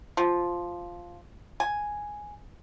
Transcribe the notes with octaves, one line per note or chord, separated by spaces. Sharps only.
F3
G#5